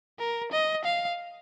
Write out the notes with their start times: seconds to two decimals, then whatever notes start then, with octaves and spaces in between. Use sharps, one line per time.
0.19 A#4
0.52 D#5
0.85 F5